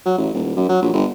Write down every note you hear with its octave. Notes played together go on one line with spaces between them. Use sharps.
F#3
A1
D#1
F#2
F#3
A#1
G1